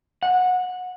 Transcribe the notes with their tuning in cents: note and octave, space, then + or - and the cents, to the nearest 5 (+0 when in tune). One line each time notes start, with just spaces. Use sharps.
F#5 -20